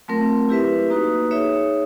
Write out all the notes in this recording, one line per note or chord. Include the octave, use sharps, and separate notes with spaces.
F#3 A3 C4 F4 A#4
E4 G4 B4 E5
A#3 D#4 F#4 B4
D#4 G#4 C#5 E5